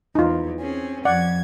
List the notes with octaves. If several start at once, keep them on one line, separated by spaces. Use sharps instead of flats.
E2 D#4 F4
C4 C#4 G#4
F2 D5 F#5 G#6